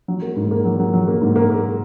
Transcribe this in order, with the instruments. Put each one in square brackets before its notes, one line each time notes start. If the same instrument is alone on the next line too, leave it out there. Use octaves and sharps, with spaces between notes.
[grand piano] F#3
A#3
G#2
A#3
F#3
F#3
F#3
A#3
G#2
A#3
A#3